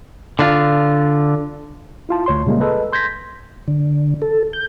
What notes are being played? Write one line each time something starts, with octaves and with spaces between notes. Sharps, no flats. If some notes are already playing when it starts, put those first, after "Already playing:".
D3 D4 F4
E4 F4 A5
D2 C#5 C6
A#2 C#3 G3 G#3 A#3
G#4 A4 B4 D#5
C6 G6 G#6 A#6 B6
D3
A4
G6